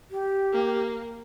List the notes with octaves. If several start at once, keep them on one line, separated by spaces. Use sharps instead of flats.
G4
A#3